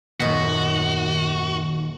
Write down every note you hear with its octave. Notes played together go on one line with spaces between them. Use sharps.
D#1 F#2 D#3 B3 F#4 D#5 A#6